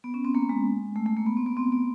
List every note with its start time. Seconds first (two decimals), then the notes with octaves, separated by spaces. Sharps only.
0.04 B3
0.14 C#4
0.25 C4
0.35 A#3
0.49 G#3
0.96 A3
1.06 A3
1.17 A#3
1.26 B3
1.37 C4
1.46 B3
1.57 C4
1.72 B3